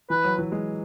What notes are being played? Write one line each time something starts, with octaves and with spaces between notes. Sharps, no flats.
E3 B4
F#3
E3
G#3